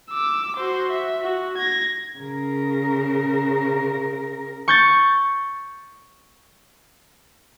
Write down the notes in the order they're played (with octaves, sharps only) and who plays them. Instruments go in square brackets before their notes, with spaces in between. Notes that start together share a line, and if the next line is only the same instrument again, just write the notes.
[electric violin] D6 E6
F#4 C5
E5
F#4
G#6 A#6
[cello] C#3 A#4
[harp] C#6 G6 A6